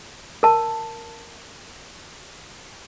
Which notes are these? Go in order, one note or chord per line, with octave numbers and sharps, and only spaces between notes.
A#4 A5